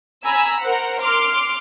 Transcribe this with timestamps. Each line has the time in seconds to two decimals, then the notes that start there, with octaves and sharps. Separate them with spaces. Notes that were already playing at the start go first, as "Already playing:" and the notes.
0.25 G#5 A#5 B5 E6
0.62 A#4 C5 F#5
1.01 C6 D6 F6